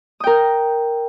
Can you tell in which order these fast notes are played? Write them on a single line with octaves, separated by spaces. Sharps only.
D#6 G5 A#4